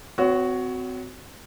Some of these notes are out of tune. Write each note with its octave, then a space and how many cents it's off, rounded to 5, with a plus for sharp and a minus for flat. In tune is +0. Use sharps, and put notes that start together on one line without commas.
C4 -35 F#4 +0 C#5 +20